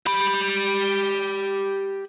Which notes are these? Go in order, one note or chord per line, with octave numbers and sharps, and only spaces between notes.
G4 B5